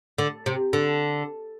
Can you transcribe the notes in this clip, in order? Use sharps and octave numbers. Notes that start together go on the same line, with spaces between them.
D3
C3
D3